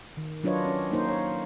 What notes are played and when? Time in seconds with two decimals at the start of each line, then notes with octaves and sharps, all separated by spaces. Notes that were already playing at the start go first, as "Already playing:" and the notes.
0.17 D#3
0.44 F#3 D4 F4 B4 C#5 D#5
0.65 C#4
0.92 A#3 D#4 C5
1.09 C#5